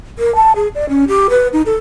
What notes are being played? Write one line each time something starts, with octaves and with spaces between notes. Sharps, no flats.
A#4
A5
G#4
D5
C#4
G4
B4
D#4
A4